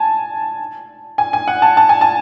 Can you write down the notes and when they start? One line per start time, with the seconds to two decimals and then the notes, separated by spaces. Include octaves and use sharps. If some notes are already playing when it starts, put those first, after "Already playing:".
Already playing: G#5 A5
1.18 G#5
1.33 G#5
1.48 F#5
1.62 A5
1.77 A5
1.89 G#5
2.01 A5